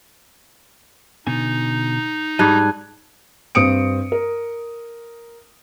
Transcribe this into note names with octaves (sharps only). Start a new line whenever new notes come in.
B2 D3 D#4 G#5
G#2 G3 D#5 A5 F#6 G#6
G2 C4 D#6 C#7 D7
A#4